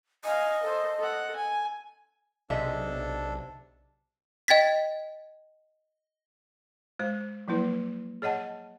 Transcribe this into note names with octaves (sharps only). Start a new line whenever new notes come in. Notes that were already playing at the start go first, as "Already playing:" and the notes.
D#5 F5 G#5
A4 C5
A4 F#5
G#5
B1 C3 D4 G#4 A4 D#5 E5
D#5 G5 G#6 A6 B6
G#3 C5
F3 F#3 A#3 E4 B4
G#4 C#5 D#5 F#5 A5